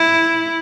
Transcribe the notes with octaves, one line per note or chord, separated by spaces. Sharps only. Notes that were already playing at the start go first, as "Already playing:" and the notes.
Already playing: E4